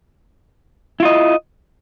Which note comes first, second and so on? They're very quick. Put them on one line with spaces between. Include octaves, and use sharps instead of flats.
E4 F4 D#5